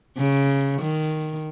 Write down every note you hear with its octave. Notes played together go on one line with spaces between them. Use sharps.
C#3
D#3